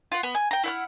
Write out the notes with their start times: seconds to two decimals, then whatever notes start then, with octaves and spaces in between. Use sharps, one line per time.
0.12 F4 F#5
0.23 B3
0.35 G#5
0.51 G5 A#5
0.63 E4 F#5 F6